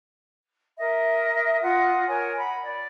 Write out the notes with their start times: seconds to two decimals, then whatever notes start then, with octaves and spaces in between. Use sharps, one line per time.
0.77 A#4 D#5 E5
1.61 F4 D#5 F#5
2.07 A#4 C#5 D#5 G#5
2.37 F#5 B5
2.63 D5